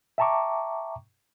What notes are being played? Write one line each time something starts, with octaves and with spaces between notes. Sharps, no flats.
E5 G5 A5 A#5 C#6 D6